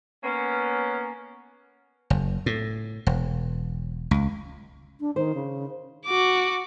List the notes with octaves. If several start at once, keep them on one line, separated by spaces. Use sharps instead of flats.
A#3 B3 C#4
F#1
A2
E1
C#2
D4
D#3 C5
C#3
F#4 D6